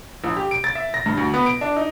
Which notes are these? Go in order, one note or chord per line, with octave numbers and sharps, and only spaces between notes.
A#1
G4
D7
A6
E5
A#6
G2
D2
B3
D7
D4
D#4